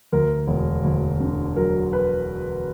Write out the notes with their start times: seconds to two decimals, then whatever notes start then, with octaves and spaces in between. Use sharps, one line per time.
0.12 D2 A#4
0.48 E1
0.84 D2
1.20 D3
1.56 F#3 A#4
1.93 B4